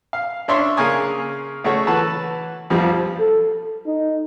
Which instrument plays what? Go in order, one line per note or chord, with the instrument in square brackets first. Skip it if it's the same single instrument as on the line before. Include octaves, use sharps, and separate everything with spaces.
[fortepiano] F5
C#4 D4 C#5 E5 C6
C#3 A#3 A#4 G#5 C#6 D#6
C#3 A3 F#4 C#5
E3 F#4 A4 B4 A5
B1 F2 F3 G3
[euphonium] A4
D#4